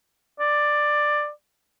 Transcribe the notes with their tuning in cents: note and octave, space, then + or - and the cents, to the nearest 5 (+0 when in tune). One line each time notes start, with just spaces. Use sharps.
D5 +10